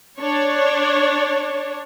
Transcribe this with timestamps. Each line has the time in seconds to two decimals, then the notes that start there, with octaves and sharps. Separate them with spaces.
0.18 D4 C#5